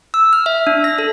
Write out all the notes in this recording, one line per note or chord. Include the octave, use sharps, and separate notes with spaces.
E6
F6
E5
D4
A#6
A4